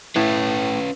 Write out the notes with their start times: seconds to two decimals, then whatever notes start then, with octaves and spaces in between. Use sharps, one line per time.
0.16 A2 C#4 B4